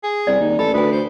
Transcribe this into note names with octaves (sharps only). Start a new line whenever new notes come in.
G#4
C2 D5
D#2 D#4
A1 A4 B5
D2 A4 B4 G#5
C5